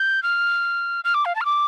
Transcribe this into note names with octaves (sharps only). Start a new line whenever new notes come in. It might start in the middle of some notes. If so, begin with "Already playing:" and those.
Already playing: G6
F6
F6
D6
F5
A5
F6
D6